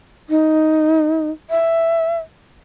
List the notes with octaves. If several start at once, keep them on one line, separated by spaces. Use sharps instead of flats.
D#4
E5